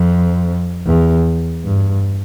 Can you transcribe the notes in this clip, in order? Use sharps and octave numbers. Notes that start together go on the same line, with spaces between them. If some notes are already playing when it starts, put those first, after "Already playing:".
Already playing: F2
E2
G2